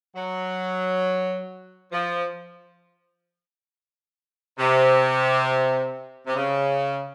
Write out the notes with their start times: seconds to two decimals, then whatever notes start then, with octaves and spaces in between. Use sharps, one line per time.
0.15 F#3
1.92 F3
4.59 C3
6.27 C3
6.36 C#3